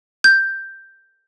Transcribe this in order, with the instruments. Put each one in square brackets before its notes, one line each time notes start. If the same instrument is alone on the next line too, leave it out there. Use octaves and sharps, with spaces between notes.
[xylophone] G6